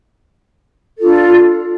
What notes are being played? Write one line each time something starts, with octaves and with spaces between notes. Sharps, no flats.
D4 F4 A4